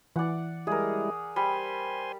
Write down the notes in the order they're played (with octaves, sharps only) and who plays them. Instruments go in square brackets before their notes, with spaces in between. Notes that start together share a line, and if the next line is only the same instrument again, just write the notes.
[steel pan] E3 [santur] D5 F#5
[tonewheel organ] G3 G#3 E4 [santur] G#4 A#4
[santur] G3 [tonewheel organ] C5 G#5 C6